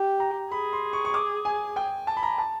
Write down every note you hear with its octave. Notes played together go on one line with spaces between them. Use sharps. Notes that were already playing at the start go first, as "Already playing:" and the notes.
Already playing: G4
A#5
G#4 B5
C6
C#6
C#6
D6
G#5
G5
A5
B5
A#5
A5